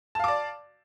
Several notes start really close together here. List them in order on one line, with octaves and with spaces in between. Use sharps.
A5 F5 D6 D5